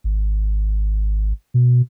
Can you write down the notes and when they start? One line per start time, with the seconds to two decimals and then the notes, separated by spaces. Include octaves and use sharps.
0.04 G#1
1.54 B2